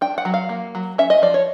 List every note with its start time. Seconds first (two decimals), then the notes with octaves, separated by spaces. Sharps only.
0.01 D4 G5
0.18 F#5
0.25 F#3
0.34 F5
0.49 A#3
0.75 F#3
0.98 C#4 E5
1.10 D#5
1.22 F3 D5
1.34 C#5